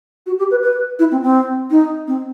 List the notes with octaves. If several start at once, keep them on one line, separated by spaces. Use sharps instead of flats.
F#4
G4
B4
B4
E4
C4
C4
D#4
C4